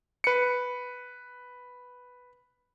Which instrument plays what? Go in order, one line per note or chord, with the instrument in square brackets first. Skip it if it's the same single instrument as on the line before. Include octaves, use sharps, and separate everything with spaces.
[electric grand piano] B4 C#7